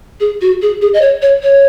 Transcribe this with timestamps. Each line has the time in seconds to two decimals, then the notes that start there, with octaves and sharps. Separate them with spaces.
0.20 G#4
0.41 F#4
0.62 G#4
0.81 G#4
0.93 D#5
1.01 C#5
1.22 C#5
1.43 C#5